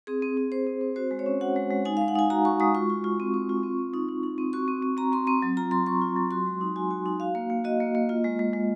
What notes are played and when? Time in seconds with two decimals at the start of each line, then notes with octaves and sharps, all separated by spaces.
0.07 C4 G#4
0.22 C4
0.37 C4
0.52 C4 C5
0.67 C4
0.81 C4
0.96 F#4 C5
1.11 G#3
1.19 C#5
1.26 C#4
1.41 F#4 F#5
1.56 G#3
1.71 G#3
1.85 D#4 G#5
1.97 G#3 F5
2.08 F#5
2.15 D#4 G#5
2.30 F#4 A#5
2.45 F#4 C#6
2.60 G#3 D#6
2.75 F4 C#6
2.90 F4
3.04 F4
3.20 C4
3.34 C4
3.49 F4
3.63 C4
3.78 C4
3.94 D#4
4.09 D#4
4.23 D#4
4.38 C4
4.53 F#4 C#6
4.68 C4
4.82 C4
4.97 C4 A#5
5.12 C4 C6
5.27 C4 C6
5.42 F#3
5.57 F4 A#5
5.71 F#3 C6
5.86 F#3 C#6
6.01 F4
6.16 F#3
6.31 F#4 C6
6.46 G#3
6.61 D#4
6.76 F#4 G#5
6.91 F#4
7.06 D#4
7.20 F#4 F5
7.35 A#3
7.50 A#3
7.64 F#4 D#5
7.80 A#3
7.95 A#3
8.09 F4
8.24 G#3
8.39 G#3
8.53 G#3